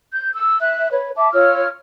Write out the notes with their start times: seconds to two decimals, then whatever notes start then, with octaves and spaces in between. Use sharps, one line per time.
0.13 G6
0.33 E6
0.61 E5 F#6
0.91 B4 C#5
1.16 E5 A5 D6
1.33 F4 C#5 E6 F6